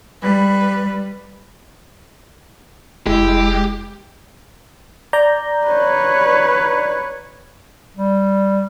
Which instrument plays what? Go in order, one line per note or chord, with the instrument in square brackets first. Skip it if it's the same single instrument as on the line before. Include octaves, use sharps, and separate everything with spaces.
[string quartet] G3 B4
[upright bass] F1 [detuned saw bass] G#3 [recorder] E4 [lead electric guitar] G4
[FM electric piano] D5 A#5 G6
[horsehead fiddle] B4 C#5
[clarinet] G3